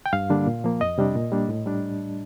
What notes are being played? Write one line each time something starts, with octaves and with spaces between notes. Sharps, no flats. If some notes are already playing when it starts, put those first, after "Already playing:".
G5
G2 F5
D3 G3 A#3 D4
A#2
F3 A#3
F2 D#5
C3 G3 D4
A#2
G3 A#3 D4
A2
G3 D4